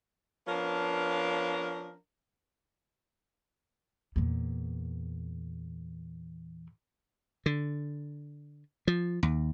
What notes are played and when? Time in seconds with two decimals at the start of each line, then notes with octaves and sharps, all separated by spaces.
0.48 F3 B3 C#4 D4 A#4 F5
4.16 E2 A#2
7.46 D3
8.88 F3
9.23 D#2